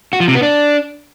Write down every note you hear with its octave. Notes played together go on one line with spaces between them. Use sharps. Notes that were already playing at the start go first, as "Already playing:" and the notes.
F#4
F3
C3
B3
D4